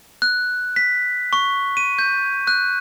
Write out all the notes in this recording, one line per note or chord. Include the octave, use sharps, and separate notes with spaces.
F#6
B6
C#6
D#7
G6
F#6